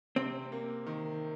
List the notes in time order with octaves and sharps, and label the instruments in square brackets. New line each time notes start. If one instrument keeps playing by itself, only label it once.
[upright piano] C3 [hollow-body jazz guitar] C4
[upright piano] A#3
D#3